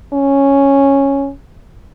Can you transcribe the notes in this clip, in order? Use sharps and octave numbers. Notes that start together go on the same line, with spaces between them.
C#4